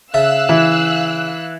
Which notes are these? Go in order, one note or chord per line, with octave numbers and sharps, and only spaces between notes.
C#3 E5 F5 A5 E6 F#6
E3